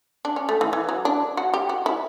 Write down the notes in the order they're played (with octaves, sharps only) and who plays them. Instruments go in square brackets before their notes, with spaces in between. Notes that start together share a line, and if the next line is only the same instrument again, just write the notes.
[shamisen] D4
C#4
A3
E3
E3
F#3
D4
F#4
G4
F#4
E4